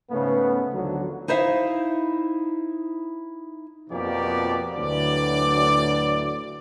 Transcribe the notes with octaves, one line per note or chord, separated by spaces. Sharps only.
G#2 C#3 A3 B3
D2 D3 D#3 F3 F#3
D#4 E4 C5 E5 F5
F2 B2 F3 A#3 G4 D5
D2 A2 F#3 B4 D5